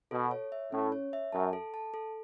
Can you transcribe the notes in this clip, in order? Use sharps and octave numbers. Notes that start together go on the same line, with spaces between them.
B2 A4
C#5
E5
A2 C#4
C#5
E5
F#2 A5
A4
A5
A4